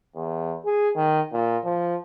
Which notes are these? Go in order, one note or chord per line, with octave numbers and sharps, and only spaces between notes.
E2
G#4
D#3
A#2
F3